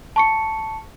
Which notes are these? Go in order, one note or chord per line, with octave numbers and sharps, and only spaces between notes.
A5 C#6 C#7